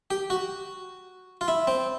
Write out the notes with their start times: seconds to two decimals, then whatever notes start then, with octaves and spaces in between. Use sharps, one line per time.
0.11 G4
0.30 F#4
1.41 F4
1.48 E4
1.67 C4